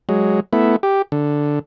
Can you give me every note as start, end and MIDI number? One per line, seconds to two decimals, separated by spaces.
0.09 0.40 54
0.09 0.40 56
0.53 0.76 57
0.53 0.76 59
0.53 0.76 64
0.83 1.02 67
1.12 1.59 50